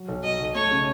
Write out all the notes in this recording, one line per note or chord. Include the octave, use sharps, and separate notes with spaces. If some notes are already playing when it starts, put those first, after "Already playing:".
Already playing: F#3
B1
F#3 D#5
B1
A3 C#5
C#3